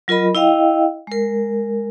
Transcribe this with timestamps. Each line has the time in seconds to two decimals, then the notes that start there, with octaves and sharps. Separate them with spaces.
0.08 F#3 F4 A#4 D#5 B5
0.35 E4 D#5 F5 G5
1.07 G#3 A#4